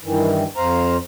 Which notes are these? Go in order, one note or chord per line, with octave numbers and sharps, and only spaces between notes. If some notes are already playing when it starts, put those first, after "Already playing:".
G2 D#3 E3
F2 C5 F5 A#5